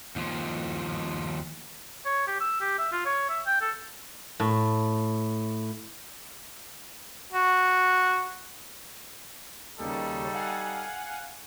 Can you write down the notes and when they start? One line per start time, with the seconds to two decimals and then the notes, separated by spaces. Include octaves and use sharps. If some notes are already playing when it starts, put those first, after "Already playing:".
0.16 D#2 F3
2.05 C#5
2.27 G4
2.41 E6
2.61 G4
2.78 E5
2.92 F4
3.06 C#5
3.29 E5
3.47 G5
3.61 A4
4.40 A2
7.32 F#4
9.79 D#2 C#3 G3 D#4 A4
10.33 F5 F#5 G#5